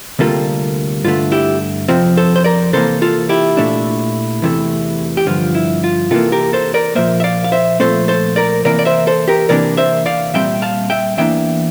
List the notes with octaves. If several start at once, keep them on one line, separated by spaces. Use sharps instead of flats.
D2 C3 G3 A#3 F4 A4
G2 D3 A3 F4
E4 G4
F2 C3 F3 C4
A4 C5
C5
A#4 D5
C3 E3 A#3 A4 C5
F4 A4
E4 G4
A#2 A3 D4
E2 C3 E3 A3
G4
G2 D3 F3 F4
E4
F4
C3 E3 A#3 F4 A4
G4 A#4
A4 C5
A#4 D5
A#2 F3 A#3 C5 E5
E5
D5 F5
F5
C5 E5
A#2 F3 A3 C4 A4 C5
A4 C5
A#4 D5
C3 E3 A#3 A#4 D5
D5
C5 E5
A4 C5
G4 A#4
C3 E3 A#3 D4 A#4 D5
C5 E5
D5 F5
A#2 G3 C4 E5 G5
F5 A5
E5 G5
E2 E3 A#3 D4 E5 G5